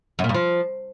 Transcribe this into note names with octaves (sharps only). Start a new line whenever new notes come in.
F#2
A#2
G2
F3